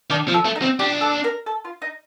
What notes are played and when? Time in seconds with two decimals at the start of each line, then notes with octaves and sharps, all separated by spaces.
0.10 D#3 D4
0.28 F3
0.34 A4
0.45 A3
0.56 D#4
0.62 C4
0.79 D4 G4
1.01 A4
1.24 A#4
1.46 A4
1.65 F4
1.82 D#4